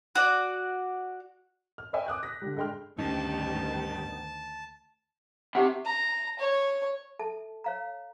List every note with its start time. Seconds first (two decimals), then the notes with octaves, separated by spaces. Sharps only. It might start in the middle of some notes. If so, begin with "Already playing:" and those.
0.15 F#4 D5
1.78 F6
1.93 B4 C#5 D#5 E5 G5 G#5
2.06 D6 D#6 F#6 G6
2.23 A#6 B6
2.42 D3 G3
2.57 G2 G#3 G5 C6 F6
2.99 D2 G2 D#3 B3 C#4 D#4 A5
5.55 C3 D#4 G4 F#5
5.85 A#5
6.39 C#5
7.19 A4 E5 A5
7.64 C#5 F5 A#5